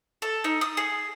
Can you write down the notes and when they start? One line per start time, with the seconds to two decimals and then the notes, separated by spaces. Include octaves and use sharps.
0.22 A4
0.44 D#4
0.61 D#6
0.77 G#4